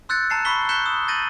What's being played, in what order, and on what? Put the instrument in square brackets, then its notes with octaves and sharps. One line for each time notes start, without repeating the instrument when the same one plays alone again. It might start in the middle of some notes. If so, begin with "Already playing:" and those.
[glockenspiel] C6 E6 F#6 G6 A6 C#7
A5 A#5 C7 C#7
B5 C#6 E6 B6 G7
F#6 G6 B6 C#7 E7 G7
D#6 E6
G6 A6 A#6 D#7 F#7